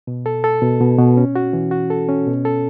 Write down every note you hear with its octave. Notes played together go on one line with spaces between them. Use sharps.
B2
A4
A4
B2
B2
B2
C#4
F#4
E3
F#4
A4
C#4
B2
A4